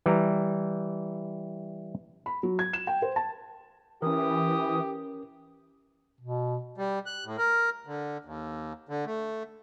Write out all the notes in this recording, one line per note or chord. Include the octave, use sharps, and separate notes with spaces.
E3 G3 A#5
B5
F#3
G#6
E7
G5
C5
A5
E3 C#4 G4 A#4 D#6
B2
G3
F#6
A2
A#4
D3
D#2
D3
A3